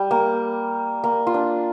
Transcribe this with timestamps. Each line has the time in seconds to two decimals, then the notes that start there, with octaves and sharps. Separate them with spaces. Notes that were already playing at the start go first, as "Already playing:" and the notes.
Already playing: G3
0.11 A#3
1.04 A#3
1.27 F4
1.34 D4